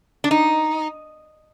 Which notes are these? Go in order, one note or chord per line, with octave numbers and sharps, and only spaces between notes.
D4
D#4